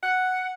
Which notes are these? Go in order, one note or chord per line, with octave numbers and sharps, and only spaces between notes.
F#5